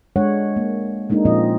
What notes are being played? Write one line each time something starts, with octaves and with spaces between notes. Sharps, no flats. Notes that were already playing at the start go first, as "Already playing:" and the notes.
G#3 D4 C#5 F#5
A#3
G#3 A#3 D4 D#4
A#2 F3 C4 C#4 F4 D#5